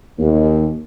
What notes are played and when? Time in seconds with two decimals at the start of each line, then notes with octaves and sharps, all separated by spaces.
0.19 D#2